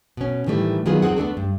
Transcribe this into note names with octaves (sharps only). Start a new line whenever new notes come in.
B2 C#4
A2 D#3 E3 G3 A3
D#3 F#3 B3 F4 G#4
E2 D#3 C4 G#4 F#5
A3 B3 D4 A4
G2